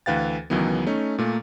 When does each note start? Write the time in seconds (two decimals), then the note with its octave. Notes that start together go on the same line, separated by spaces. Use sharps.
0.06 D2 E3 B4 F5 G5 A6
0.50 C#2 D#3 E3 F#3 B3
0.87 A3 C#4 D#4
1.18 A#2 A3 A#3